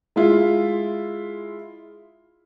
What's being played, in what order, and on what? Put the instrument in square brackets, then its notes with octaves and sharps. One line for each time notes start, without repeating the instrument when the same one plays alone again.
[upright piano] G#3 E4 F4